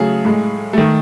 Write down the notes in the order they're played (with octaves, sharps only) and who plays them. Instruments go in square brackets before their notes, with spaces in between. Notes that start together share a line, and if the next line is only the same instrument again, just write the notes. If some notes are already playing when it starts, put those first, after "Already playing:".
Already playing: [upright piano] C#3 F#3 A3 G#4
A2 G#3
D#3 A3